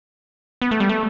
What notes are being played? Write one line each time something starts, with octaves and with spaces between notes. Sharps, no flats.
B3
A3
G3
A3